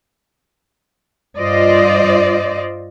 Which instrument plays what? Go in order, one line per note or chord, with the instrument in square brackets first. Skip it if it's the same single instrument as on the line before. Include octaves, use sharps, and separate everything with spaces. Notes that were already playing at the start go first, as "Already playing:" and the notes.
[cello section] G2 F4 C5 D5 D#5